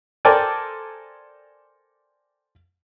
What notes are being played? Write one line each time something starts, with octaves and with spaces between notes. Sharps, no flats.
A4 A#4 C5 D5 G5 G#5